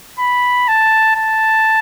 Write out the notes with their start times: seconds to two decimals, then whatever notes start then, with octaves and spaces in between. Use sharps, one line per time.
0.19 B5
0.68 A5
1.16 A5